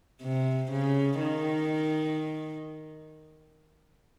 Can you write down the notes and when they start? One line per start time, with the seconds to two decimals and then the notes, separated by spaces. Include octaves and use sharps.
0.22 C3
0.71 C#3
1.20 D#3